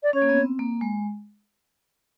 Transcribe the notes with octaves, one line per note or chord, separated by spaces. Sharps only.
D5
C#4 C#5
A#3
B3
C4
A#3
G#3